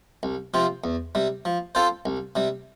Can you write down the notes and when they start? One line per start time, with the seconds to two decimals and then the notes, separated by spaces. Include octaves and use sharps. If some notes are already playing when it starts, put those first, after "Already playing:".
0.23 C2
0.54 C3 F3 C4 F4
0.84 E2
1.15 C3 G3
1.45 F3
1.75 C4 F4 A4 C5
2.06 C2
2.36 C3 G3